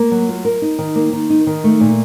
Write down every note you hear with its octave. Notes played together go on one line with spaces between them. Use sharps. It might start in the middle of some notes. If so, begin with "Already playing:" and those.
Already playing: A#3
F#3
F4
A#4
D#4
D#3
A#3
D#3
D#4
D#3
A3
A#2